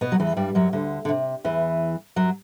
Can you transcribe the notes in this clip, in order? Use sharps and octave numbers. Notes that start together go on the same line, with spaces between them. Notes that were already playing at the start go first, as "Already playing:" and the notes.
B2 B3
F#3
E2 E3
G2 G3
F#2 F#3
D2 D3
D3
C3
E2 E3
F#2 F#3